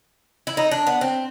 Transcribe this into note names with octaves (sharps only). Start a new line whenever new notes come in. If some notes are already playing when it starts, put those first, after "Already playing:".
E4
D#4
D4
B3
C4